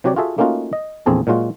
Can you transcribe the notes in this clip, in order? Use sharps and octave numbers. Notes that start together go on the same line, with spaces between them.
C3 F#3 F#4 G4 C#5 D5
F4 F#4 G#4 A4 E5
A3 A#3 C#4 D#4 F4 F#4
D#5
A#1 E2 C4 G#4 A4
A#2 F#3 G#3 F4 F#4